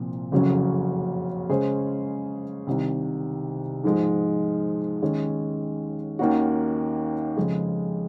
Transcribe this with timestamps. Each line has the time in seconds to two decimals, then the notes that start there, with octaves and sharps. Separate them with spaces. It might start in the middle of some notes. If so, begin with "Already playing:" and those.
Already playing: C2 A#2 F3 C4
0.32 F#1 F2 C#3 F#3 C#4
1.50 C#3 G#3 C#4 G#4 C5
2.67 C2 C3 D#3
3.84 G#2 F3 G#3
5.02 D#2 D#3 G#3 C#4
6.19 D#2 D#3 A#3 C#4 F#4
7.37 F2 C#3 F3 G#3